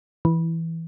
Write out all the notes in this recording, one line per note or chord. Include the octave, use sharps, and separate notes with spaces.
E3